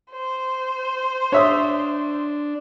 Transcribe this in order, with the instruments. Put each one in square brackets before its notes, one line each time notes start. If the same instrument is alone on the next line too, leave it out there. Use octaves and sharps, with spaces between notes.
[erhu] C5
[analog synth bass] D4 [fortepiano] C#5 E5 D#6